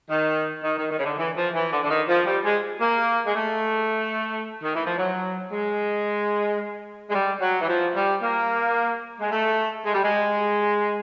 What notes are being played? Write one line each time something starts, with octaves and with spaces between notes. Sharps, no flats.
D#3
D#3
D#3
D#3
C#3
D3
E3
F3
E3
D3
D3
D#3
F3
G3
G#3
A#3
G#3
A3
D#3
E3
F3
F#3
G#3
G#3
G3
F#3
E3
F3
G3
A#3
G#3
A3
G#3
G3
G#3